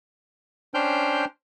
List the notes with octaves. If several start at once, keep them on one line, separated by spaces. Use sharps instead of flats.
C#4 D4 C5 G5 F6 G6